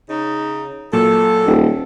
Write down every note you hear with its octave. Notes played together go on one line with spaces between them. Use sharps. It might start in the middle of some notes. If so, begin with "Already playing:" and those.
C#3 D#4
A#2 F#3 A4
D#1